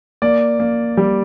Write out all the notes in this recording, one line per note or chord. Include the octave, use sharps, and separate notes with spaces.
A#3 D5
A#3
G3